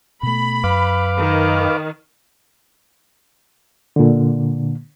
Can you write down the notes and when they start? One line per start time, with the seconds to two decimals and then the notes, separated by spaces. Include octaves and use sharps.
0.23 B2 A3 B5
0.64 F#2 B4 F5 D6
1.20 D#3
3.96 A#2 D3